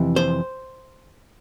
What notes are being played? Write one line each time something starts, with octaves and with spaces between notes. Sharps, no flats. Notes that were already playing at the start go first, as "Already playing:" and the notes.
Already playing: F2 C3 E3
C5